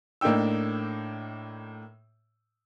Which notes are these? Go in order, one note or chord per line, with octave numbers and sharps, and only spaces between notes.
A2 A#3 D4 D#4 G5 E6